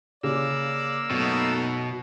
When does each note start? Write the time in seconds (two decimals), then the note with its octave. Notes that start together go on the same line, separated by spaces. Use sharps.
0.23 C#3 A#3 D5 E6
1.11 F#2 B2 A3 D#4